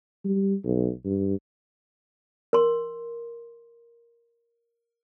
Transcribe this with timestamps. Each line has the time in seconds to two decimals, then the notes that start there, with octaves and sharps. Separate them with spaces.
0.25 G3
0.65 B1
1.05 G2
2.53 A#4 C6